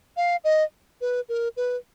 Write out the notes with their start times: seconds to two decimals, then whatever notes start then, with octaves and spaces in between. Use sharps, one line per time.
0.17 F5
0.44 D#5
1.01 B4
1.29 A#4
1.57 B4